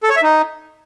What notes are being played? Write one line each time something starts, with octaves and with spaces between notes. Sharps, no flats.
A4
C#5
E5
D#4